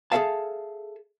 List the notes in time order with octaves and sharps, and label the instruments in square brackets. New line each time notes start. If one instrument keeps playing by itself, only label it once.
[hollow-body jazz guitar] G#4 A4 C#5 E5 F5 A5